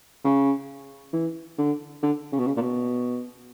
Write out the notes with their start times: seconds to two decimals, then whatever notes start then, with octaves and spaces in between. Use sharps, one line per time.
0.24 C#3
1.13 E3
1.58 D3
2.03 D3
2.32 C#3
2.39 B2
2.47 C#3
2.56 A#2
2.62 B2